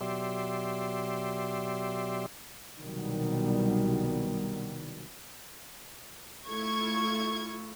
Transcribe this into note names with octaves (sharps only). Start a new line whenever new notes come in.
B2 F#3 G4 D5 E5 C6
C2 B2 D#3 F#3 G3 B3
A3 E4 F4 C#6 G#6